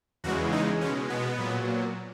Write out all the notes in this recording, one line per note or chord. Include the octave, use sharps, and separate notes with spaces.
E2 C#3 E3 G#3 F#4
D#4
B2 G#3 C#4
B3
A#2 F#3